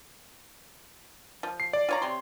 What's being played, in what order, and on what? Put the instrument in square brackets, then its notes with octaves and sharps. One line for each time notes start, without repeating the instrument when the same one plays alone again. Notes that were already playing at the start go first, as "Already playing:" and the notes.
[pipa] F3
[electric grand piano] C7
D5
[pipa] F4 C#5 A#5
C3 C#5 C6